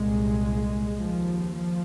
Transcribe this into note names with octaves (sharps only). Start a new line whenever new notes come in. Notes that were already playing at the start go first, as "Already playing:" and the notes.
Already playing: C2 A#2 G#3
D#2 F3
F3